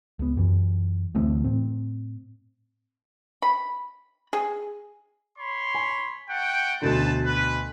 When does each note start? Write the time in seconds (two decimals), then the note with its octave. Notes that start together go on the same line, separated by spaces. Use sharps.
0.19 C#2 B3
0.37 F#2 E3
1.15 D2 E3 A3 C4
1.44 A2 C4
3.42 B5
4.33 G#4
5.39 C#5 B5 C6
5.75 G#5
6.29 A3 F#5 G5
6.82 D2 B2 D3 B4 C5 A5
7.26 B4